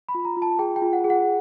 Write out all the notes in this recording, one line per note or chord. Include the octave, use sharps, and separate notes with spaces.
B5
F4
A#5
F4
A5
G#4 G5
G5
F4
F#5
G#4
F#5